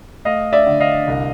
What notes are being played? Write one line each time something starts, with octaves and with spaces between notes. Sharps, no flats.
A3 D#5 F5
D5 E5
D3
D#5 F5
C2